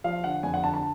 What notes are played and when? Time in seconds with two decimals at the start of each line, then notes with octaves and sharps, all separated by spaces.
0.04 F3 F5
0.24 D3 F#5
0.43 F2 G#5
0.54 F#5
0.64 D3 A5
0.74 A5